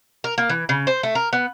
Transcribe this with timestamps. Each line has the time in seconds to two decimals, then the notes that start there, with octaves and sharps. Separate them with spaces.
0.24 A#4
0.38 A#3
0.50 E3
0.69 C#3
0.87 C5
1.03 A3
1.15 A#4
1.33 B3